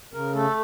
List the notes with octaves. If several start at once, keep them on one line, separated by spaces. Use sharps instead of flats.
C#3 A#4
A3 A4